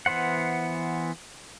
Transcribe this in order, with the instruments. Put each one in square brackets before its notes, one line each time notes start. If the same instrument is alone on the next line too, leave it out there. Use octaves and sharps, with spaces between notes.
[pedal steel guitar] E3 B3 C5 F#5